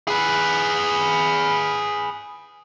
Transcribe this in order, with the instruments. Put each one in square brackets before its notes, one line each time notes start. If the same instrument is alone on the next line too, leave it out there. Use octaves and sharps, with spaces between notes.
[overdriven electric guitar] G#4 B4